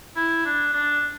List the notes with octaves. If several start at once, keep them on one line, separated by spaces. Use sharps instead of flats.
E4
D4
D4